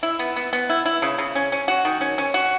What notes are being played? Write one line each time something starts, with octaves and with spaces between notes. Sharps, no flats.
E4
B3
B3
B3
E4
E4
C#3
C#3
C#4
C#4
F#4
D#3
C#4
C#4
F#4